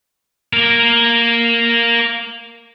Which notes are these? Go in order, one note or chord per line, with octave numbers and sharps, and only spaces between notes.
A#3 A#4